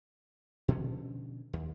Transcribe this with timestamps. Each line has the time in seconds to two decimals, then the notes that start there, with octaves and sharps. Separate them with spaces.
0.68 B2 D3 F3 C#4
1.53 D#2